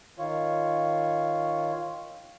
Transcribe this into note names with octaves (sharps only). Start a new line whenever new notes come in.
D#3 F4 C#5